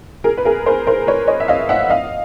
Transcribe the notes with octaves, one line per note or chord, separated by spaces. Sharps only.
G#4 A#4
B4
G#4 A#4
A#4 C5
A#4 C5
B4 C#5
C#5 D#5
E5
D#5 F5
E5 F#5
D#5 F5